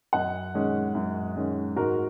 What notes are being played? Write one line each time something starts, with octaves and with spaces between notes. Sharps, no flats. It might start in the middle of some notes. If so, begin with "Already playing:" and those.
F#2 D#5 F#5
D#3 G#3 C#4
F#2
D#3 G#3 C#4
G#2 F#4 A#4